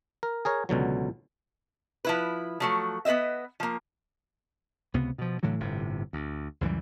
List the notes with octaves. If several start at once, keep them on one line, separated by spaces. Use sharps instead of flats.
A#4
G#4 A#4 C#5
C#2 B2 D3 F#3
F3 E4 B4
F3 F#3 A3
B3 B4 C5 D#5 E5
F3 A#3
C#2 C3 B3
B2 F3
A2 D3 E3 F#3
G1 A2 C3
D2
C#2 F#2 E3 G3